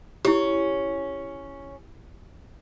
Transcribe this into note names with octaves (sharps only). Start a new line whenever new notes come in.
C#4 E4 G4